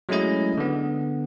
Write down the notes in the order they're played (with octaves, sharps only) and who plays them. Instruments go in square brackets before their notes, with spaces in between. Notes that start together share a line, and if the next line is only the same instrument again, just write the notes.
[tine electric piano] F#3 G#3 A3 C#4 E4 D#5
D3 B3